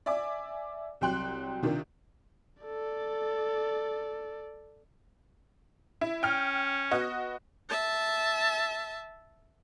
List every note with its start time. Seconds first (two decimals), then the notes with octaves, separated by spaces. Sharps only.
0.06 D5 E5 G#5 D6
1.01 C2 F#3 G5 C6 F#6
1.63 C3 D#3 D4 F4
2.63 A4 D5
6.01 E4
6.23 C#4 G5 F6
6.91 B3 F#4 D#5
7.69 E5 A5